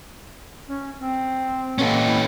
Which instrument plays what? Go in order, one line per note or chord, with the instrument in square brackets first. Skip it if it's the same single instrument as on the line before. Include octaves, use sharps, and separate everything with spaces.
[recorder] C#4
C4
[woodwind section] B2 A#3 C4 [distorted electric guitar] C#4 A4
[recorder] E4